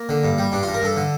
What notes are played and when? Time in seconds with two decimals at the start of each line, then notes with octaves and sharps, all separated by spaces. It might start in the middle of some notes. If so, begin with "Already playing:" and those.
Already playing: A#3
0.09 D3
0.23 G2
0.38 G3
0.52 G2 D4
0.63 G2 F4
0.74 A#4
0.82 G2 A4
0.96 D3